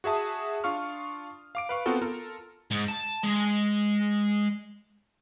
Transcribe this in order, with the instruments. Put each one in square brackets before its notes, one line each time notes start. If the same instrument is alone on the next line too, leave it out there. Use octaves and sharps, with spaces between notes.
[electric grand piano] F#4 G#4 E5 A5 D#6
D4 F4 F5 C#6 F6
F5 D6 D7
B4 F5 C#6
B3 C4 F4 F#4 A4 A#4
F4 A4 A#4
[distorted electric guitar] G#2
A5
G#3